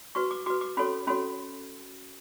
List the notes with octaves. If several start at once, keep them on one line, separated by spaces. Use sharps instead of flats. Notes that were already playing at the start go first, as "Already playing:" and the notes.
F#4 B4 C#6
D6
F#4 B4 D6
D6
C#4 F#4 A4 C#5 B5
C#4 F#4 A4 C#5 B5